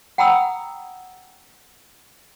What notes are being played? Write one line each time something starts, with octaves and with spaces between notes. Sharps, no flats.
F#5 G5 A#5 B5 D#6 E6